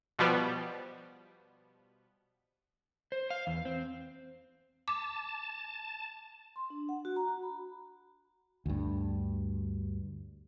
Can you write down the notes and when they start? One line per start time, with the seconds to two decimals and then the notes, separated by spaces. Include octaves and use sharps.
0.19 B2 F3 G3 B3
3.12 C5
3.30 F5
3.47 E2
3.65 C4
4.88 A5 D6
6.56 C6
6.70 D4
6.89 F#5
7.05 F#4
7.16 A#5
7.29 F#4
7.43 B5
8.66 D2 G2